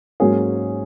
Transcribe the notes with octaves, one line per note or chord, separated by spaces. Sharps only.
G#2 F#3 A#3 C#4 G#4